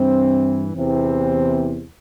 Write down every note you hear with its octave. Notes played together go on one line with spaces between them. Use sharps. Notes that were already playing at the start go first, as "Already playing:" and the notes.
Already playing: G2 E3 C4
E2 C3 E3 C4